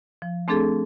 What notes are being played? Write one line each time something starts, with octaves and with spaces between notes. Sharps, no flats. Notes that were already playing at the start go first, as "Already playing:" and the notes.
F3
A3 C4 D4 G#4 A4